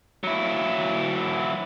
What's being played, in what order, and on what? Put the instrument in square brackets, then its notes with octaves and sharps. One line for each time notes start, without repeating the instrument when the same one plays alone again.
[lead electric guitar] F#3 E4